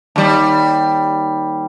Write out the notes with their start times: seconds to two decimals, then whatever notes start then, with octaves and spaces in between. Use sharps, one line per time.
0.16 D#2 G3